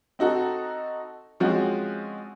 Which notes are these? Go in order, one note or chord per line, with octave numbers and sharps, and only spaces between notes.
C4 D#4 F#4 A4
F3 G#3 C4 C#4 F#4